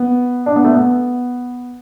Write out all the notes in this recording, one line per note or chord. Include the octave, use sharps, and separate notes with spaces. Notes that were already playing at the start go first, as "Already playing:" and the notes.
Already playing: B3
D4
B3
A3
B3